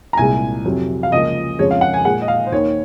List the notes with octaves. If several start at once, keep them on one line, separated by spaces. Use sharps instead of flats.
A#5
C2 A#2 G#3 G#5
F2 C3 F#3
F5
C#2 C#3 F3 A#3 D#5
F2 C#3 F3 G#3 C#5
F5
F#5
G#5
A#2 G#3 F#5
D#5
F5
C5
D#2 D#3 A#3 C#5